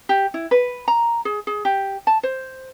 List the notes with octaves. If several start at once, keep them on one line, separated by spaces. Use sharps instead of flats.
G4
E4
B4
A#5
G#4
G#4
G4
A5
C5